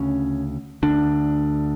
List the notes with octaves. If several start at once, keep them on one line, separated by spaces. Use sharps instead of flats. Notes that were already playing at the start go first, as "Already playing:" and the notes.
Already playing: D2 C#3 C#4
D2 D3 D4